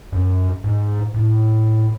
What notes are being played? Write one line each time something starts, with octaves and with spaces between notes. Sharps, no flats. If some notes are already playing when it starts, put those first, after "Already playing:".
F#2
G#2
A2